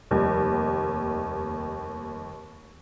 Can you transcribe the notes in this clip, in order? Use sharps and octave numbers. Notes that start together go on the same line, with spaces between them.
F1 D#2 G3